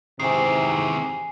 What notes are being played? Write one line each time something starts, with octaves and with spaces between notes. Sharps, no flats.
G#2 C3 D#3 E3 G#5 C7